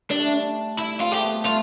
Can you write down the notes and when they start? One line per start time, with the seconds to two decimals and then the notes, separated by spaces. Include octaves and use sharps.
0.11 G3 D4
0.19 A3
0.27 G3
0.79 E4
1.01 C4 F4
1.12 A3 G4
1.24 B3
1.46 A3 F4